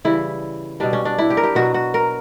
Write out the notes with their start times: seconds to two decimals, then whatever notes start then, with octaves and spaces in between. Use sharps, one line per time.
0.05 C#3 E3 G3 E4
0.80 B2 G3 D4
0.93 C#4
1.05 D4
1.18 E4
1.30 G4
1.37 A#4
1.44 G4
1.55 B2 F#3 F#4
1.74 F#4
1.94 A#4